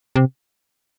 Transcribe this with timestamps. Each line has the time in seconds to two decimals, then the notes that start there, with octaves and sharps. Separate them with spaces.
0.16 C3